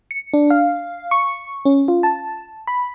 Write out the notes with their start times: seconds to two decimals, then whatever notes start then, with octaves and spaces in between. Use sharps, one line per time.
0.11 C#7
0.34 D4
0.50 F5
1.11 C#6
1.65 C#4
1.88 F4
2.03 A5
2.67 B5